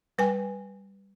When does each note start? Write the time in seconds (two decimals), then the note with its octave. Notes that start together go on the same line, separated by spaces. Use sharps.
0.18 G3 B4 G5 G#5